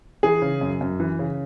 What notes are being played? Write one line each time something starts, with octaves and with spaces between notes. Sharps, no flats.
E3 G#4
C#3
F#2
F#2
E3
C#3